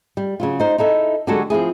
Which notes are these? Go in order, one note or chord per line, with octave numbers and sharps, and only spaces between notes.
G3
C#3 F#3 F4
D#4 C5
D#4 E4 A4 E5
D3 F#3 G#3 F#4 G4 A4
F3 C4 E4 G#4